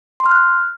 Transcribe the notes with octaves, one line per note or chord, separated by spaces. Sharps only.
C6
F6
F#6